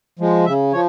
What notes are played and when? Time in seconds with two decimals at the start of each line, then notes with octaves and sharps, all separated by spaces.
0.19 F3 G#3
0.45 C#3 E5
0.73 F3 C#5